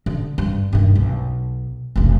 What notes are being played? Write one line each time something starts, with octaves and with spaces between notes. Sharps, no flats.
D3
G2
G2 D#3
B1
F1 B1